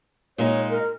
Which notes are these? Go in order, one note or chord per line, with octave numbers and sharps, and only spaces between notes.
A#2 G#3 D#4 C#5
A#4